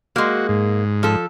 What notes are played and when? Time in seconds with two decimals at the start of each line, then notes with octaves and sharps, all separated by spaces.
0.16 G#3 A#3 F#4
0.49 G#2
1.03 F3 A4